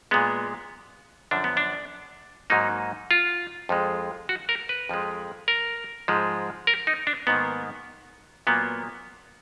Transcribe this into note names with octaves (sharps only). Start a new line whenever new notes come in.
A#2 G#3 B3
F#2 D3 F3 D4
B3
D4
G#2 F#3 A#3 D#4
F4
F2 F3 G#3
F#4
A#4
B4
F2 F3 G#3
A#4
G#2 F3 G#3
A#4
D#4
D4
G#2 D#3 A#3 B3
A#2 F#3 A#3 B3